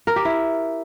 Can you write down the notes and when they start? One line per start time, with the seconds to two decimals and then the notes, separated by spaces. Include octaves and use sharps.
0.07 A#4
0.16 G4
0.25 E4